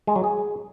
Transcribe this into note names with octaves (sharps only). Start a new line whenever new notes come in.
G#3
F#3
G#4